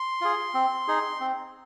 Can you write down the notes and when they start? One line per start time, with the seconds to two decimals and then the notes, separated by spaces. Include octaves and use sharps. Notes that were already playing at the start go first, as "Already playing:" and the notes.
Already playing: C6
0.21 F4 G#4
0.54 C4
0.88 D#4 G#4
1.20 C4